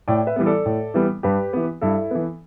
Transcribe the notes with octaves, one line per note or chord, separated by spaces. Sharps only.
A2 D5 G5
B4 E5
E3 G3 B3
A4 D5
A2
E3 G3 B3
G2 G4 B4
E3 B3
G2 E4 A4
E3 B3